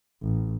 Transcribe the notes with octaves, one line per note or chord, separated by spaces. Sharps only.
A1